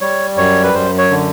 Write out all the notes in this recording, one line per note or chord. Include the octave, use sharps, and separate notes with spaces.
G3 C#5
F#2 C#5
B4
F#2 C5
C#5
D3